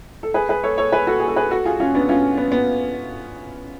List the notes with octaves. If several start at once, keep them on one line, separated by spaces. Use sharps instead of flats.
A4
G#4 B4
G#4 B4
A4 C#5
A4 C#5
G#4 B4
F#4 A4
G#4
A4
G#4 B4
F#4 A4
F4 G#4
C#4 F4
B3 D4
C#4 F4
B3
B3